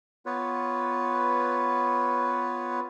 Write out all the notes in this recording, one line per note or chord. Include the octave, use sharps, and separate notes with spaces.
B3 F4 B4 C#5